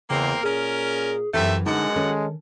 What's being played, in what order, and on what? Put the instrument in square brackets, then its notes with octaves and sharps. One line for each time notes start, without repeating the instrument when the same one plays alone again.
[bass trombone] E2 [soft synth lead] C#3 [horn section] A#3 C4 A#4
[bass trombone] A#2 [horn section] C#4 A#4 [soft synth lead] G#4
[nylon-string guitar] F#2 E3 [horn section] C3 A3 E5
[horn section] F#2 B2 F#5 [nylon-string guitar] D3 [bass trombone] G#3 [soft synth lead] D#4
[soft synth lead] D#3 [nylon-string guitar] C#4 A4